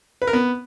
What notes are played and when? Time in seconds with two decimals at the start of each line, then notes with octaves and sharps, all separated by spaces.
0.22 B4
0.27 A#4
0.33 B3